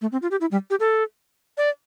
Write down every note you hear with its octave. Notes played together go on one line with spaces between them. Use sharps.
A3
C4
F4
G4
E4
G3
G4
A4
D5